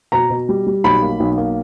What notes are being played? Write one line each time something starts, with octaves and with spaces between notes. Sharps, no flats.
B2 A#5
B2
G3
G3
B1 B5
A#3
B1
A#3